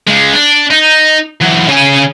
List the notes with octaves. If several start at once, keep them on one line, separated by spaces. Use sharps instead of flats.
C#3 G#3
D4
D#4
E3 F#3
C#3 G#5